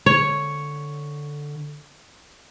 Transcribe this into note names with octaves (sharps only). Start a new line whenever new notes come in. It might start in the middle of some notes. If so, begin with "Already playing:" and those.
D3 C#5